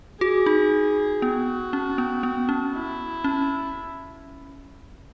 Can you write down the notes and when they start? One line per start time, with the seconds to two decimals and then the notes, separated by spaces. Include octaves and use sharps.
0.21 F#4 G#4
0.46 D#4
1.22 B3 F#4
1.73 C#4
1.98 B3
2.23 B3
2.49 C#4
2.74 E4
3.24 C#4